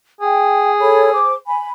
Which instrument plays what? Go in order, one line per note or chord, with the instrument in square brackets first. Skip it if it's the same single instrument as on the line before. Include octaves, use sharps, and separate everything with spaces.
[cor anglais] G#4 [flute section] G5
[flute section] A4 C#5 B5
C5 D6
G#5 B5